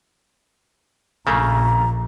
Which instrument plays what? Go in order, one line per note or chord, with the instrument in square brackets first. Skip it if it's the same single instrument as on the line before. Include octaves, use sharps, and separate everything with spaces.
[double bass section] A#1 [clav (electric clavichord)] C#3 A3 A#3 [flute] A#5